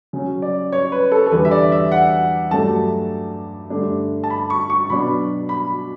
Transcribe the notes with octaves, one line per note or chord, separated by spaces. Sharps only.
C#3 F#3 C#4
D5
C#5
B4
A4
A4
E2 D3 G3 B4
E5
D5
E5
F#5
G2 F#3 A3 D4 A5
G2 D3 A3 D4
A5
B5
C#6
C#6
B2 F#3 B3 D4 B5
B5